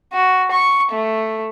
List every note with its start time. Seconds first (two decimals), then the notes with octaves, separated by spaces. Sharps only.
0.13 F#4
0.51 C#6
0.92 A3